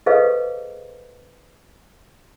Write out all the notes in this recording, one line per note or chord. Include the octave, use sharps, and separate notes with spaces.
G#4 A4 B4 C5 D#5 F5